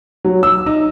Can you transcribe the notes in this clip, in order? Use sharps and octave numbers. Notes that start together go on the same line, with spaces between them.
F#3
E6
D#4